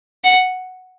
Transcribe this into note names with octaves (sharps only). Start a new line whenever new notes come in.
F#5